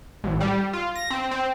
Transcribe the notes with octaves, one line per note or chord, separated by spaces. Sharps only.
A1
G3
F4
A#6
C4
C4